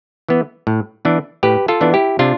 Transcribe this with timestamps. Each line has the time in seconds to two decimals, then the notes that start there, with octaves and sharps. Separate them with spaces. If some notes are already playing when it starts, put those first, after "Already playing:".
0.29 E3 B3
0.67 A2
1.05 E3 B3 D4
1.43 A2 G4 B4
1.68 F4 A4
1.81 E3 B3 D4
1.94 E4 G4
2.19 C3 D4 F4